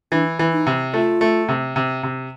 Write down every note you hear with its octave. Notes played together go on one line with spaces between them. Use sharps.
E3 D4
E3
D#4
C3
A3 F4
A3
C3
C3
C3